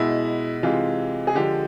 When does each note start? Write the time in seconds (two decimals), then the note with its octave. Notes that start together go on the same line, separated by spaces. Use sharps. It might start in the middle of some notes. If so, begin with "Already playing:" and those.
Already playing: B2 G#3 E4
0.63 C3 E3 G#3 F4
1.27 G#4
1.35 D3 F3 G#3 G4